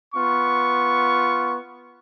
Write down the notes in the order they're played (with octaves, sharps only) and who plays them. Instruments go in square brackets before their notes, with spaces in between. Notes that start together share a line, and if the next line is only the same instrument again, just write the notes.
[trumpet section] B3 F4 C#6